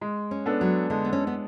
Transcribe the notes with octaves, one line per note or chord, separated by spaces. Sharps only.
G#3
C#4
B3 D4 A4
F#3
D3 G#3
B3
C#4
B3